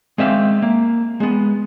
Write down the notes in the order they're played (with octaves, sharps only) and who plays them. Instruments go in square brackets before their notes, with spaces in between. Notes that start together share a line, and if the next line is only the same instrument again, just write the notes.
[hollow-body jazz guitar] G#3 C4 E5 F5
A#3
G#3 B3